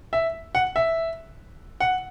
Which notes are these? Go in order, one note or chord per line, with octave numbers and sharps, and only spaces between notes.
E5
F#5
E5
F#5